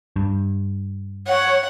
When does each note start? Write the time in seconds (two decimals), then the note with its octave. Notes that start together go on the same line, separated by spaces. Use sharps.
0.16 G2
1.27 C#5 F#5